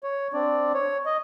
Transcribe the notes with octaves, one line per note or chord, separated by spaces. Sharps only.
C#5
C4 D4 D5
C#5
D#5